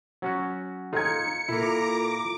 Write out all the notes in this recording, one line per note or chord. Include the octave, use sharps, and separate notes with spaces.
F#3 C#4 F#4
D#4 F4 A4 A#5 G#6 C#7
A#2 A#3 E4 A4 A#5 D6
D6